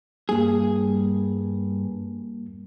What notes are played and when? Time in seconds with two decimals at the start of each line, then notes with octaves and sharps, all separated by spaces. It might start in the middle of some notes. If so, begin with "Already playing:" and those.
0.29 G2 G3 A#3 G#4